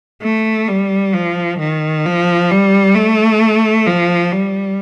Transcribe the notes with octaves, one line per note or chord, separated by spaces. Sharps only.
A3
G3
F3
D#3
F3
G3
A3
F3
G3